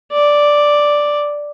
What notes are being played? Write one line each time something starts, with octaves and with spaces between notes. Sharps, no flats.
D5